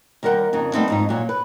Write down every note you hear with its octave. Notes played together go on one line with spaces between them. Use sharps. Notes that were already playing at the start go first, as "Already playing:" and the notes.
D#2 G3 A#4 C#5 F#5 G5
F2 C#3 D#4
G3 A3 B3 C4 D#4
F2 G#2 D#4
A#2 F#3
B4